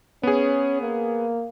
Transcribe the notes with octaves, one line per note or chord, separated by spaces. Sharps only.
B3 C#4 G#4
A#3